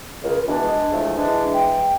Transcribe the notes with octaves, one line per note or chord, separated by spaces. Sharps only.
C#2 A#4
B2 E3 D4
G#3
E2 F3 A3
E3 G#3 D4
G5